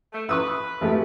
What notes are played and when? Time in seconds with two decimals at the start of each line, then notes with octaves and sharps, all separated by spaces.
0.13 A3
0.29 B4 C#6 D#6 E6
0.81 G#1 A3 G4